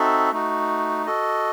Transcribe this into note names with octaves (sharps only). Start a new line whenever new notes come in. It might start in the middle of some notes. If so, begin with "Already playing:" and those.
Already playing: C4 D#4 F#4 A4 E5
A3 D#4 F#4
F#4 A4 D#5